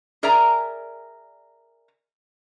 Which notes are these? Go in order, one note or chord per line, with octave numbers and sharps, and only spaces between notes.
G#4 A#4 D5 E5 G#5 A#5